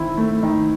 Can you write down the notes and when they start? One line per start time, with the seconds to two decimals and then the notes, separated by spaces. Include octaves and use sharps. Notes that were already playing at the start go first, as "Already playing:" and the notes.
Already playing: D#3 C4 E4
0.17 A3
0.43 D#3